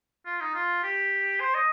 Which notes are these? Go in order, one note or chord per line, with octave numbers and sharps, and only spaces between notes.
F4
D#4
F4
G4
C5
D#5